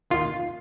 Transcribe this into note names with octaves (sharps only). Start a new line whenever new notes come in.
D#2 D#3 F4